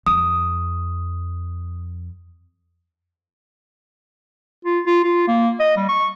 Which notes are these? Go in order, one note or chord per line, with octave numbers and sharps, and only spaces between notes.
F2 D#6
F4
F4
F4
A#3
D#5
G3
C#6